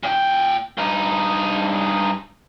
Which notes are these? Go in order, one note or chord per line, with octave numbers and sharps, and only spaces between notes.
A#2 G5
G2 D#4